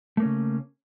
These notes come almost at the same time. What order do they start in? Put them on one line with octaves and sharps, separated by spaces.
A3 A#3 C#4 C#3